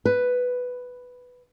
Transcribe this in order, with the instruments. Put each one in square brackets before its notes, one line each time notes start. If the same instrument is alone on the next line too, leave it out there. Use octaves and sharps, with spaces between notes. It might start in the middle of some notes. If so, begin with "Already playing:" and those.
[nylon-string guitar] B4